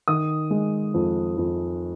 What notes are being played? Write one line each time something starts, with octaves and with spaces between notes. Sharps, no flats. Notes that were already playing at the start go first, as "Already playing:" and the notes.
D#3 D#6
G#3
F2
F2